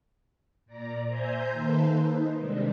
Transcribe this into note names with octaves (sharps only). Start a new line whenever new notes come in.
A#2 D5 A#5
C5 E5 G#5 A#5 G6
D#3 A#3 A4 B4 C5
D#4
C3 D#3 G3 G#3 D4